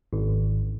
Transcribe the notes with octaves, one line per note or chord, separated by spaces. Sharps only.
G#1